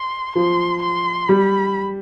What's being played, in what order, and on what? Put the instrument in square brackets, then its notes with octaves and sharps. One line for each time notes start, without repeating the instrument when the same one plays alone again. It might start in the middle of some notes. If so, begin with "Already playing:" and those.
Already playing: [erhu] C6
[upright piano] F3 [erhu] C6
[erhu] C6
[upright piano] G3 [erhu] B5